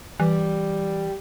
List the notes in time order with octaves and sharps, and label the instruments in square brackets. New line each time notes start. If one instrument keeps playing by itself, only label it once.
[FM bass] E3 [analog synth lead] G3